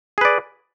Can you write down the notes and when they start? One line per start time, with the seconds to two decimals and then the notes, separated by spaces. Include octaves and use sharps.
0.18 G#4
0.21 B4
0.25 D5